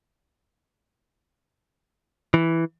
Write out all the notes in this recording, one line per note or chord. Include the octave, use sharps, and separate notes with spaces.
E3